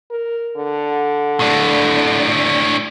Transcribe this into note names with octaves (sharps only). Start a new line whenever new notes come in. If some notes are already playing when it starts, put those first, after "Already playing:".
A#4
D3
A2 D4